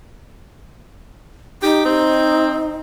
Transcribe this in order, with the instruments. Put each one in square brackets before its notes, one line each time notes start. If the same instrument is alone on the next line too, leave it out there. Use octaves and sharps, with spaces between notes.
[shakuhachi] D#4 [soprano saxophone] G4
[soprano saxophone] C4